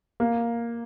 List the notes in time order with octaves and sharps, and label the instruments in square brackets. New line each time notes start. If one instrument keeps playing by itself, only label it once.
[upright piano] A#3